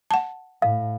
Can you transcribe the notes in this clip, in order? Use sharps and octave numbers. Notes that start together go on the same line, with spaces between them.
F#5 A5
A2 F5